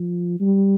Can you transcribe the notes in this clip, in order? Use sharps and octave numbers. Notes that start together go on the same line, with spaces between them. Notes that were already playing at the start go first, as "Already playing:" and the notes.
Already playing: F3
G3